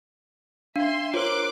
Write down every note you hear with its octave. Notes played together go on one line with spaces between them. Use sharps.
D4 E5 F5 C6 G#6
F4 A#4 C5 C#5 C6 D6 F#6